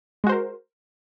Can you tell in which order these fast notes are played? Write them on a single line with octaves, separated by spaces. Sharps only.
G#3 F#4 C5 A#4